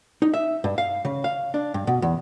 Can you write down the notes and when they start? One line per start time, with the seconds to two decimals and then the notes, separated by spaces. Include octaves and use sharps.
0.22 D#4
0.34 E5
0.64 G2
0.78 F5
1.05 C#3
1.24 F5
1.54 D4
1.74 G2
1.87 B2
2.02 E2